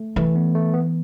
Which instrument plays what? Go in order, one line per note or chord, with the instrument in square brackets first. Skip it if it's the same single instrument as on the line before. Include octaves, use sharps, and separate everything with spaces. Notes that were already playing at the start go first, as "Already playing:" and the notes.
Already playing: [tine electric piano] A3
[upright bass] E3 [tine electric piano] A3
[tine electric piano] B3
A3
B3